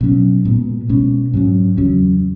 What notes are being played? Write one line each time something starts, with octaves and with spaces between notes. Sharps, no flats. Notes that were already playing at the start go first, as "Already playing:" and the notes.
B2 F#3 C#4
A#2 G#3 B3
B2 G#3 C#4
G#2 F#3 C#4
E2 C#3 F#3 C#4